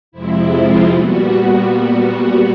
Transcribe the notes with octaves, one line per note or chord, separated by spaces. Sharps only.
F2 C3 F3 G#3 C4 E4
F4
A#2 G3 B3 F#4